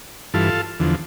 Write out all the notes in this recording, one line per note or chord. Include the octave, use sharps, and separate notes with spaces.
G2 E3 F4 A4
E2 D3 F3